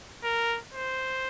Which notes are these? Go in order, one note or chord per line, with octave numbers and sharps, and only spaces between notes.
A#4
C5